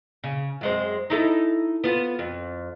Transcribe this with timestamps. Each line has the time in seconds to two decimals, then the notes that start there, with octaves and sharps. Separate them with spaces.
0.24 C#3
0.61 F#2 G#3 C4
1.10 D#4 E4 A4
1.84 B3 F4
2.19 F2